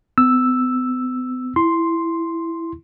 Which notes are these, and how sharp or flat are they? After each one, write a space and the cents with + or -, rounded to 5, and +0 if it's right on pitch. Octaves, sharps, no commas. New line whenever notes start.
B3 +45 E6 +0
E4 +5 C6 +0